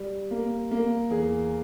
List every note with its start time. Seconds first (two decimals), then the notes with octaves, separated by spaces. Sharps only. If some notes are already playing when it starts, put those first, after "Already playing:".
Already playing: G3
0.31 A#3
0.71 A#3
1.10 E2 G#4